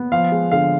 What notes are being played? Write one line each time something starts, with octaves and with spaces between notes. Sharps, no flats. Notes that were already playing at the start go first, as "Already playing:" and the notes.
Already playing: B3
F3 F5
G#3
D3 F5